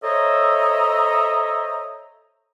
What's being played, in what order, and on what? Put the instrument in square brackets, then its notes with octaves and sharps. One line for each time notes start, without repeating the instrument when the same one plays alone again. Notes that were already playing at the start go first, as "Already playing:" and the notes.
[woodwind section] A4 C5 C#5 D#5 E5 A#5